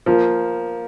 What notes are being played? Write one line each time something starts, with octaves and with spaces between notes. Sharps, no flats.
F3 A#3